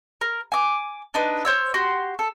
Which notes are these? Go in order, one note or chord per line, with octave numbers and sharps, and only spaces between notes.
A#4
G#5 D6
D4 D#4 B4
C5 C#5 E6
F#4 G4 C6
A4